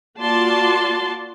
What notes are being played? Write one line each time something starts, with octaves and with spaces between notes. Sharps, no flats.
A#3 F4 F#4 D5 A5 C6